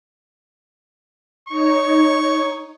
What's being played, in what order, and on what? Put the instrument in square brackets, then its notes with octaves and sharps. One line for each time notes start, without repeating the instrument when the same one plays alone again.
[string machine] D#4 C#5 [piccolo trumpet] C#6